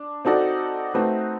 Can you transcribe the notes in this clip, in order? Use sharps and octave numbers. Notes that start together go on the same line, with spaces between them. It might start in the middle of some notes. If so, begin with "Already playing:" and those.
Already playing: D4
C4 D#4 F#4 A4 D5
A3 C4 D#4 F#4 B4